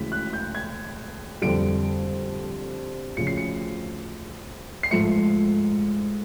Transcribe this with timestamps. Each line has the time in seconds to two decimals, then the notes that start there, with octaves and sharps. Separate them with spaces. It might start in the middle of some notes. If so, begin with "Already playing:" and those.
Already playing: D2 C#3 E3 G#3 B6
0.12 F#6
0.33 G6
0.55 G#6
1.42 F2 D3 G3 D7
3.17 D2 C#3 F3 C#7
3.27 C7
3.37 C#7
4.83 C7
4.91 G#2 F3 A3 C#7